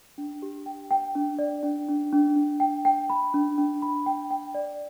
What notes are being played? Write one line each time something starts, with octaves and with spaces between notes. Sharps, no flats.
D4
G4
G5
G5
D4
D5
D4
D4
D4
D4
G5
G5
B5
D4
D4
B5
G5
G5
D5